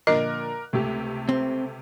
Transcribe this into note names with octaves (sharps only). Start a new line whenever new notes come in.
A#2 D3 F3 A#4 D#5 D6 F#6
C#2 C3 A3 G4
C4